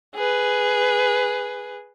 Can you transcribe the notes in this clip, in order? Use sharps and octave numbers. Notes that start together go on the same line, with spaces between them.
G#4 B4